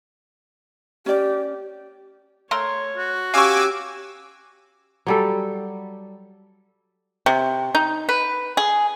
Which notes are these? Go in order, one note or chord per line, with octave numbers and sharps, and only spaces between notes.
C#4 G4 D5
A3 A#4 C#5 C6
F#4
C#4 G4 F5 G#5 C#6 D6 E6
F#3 G3 A4
C3
D#4
B4
G#4